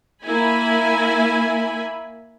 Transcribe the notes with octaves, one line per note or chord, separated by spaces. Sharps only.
A#3 E4 G#5 B5